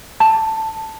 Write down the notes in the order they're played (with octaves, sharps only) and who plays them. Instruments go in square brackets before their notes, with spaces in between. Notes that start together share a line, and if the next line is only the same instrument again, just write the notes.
[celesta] A5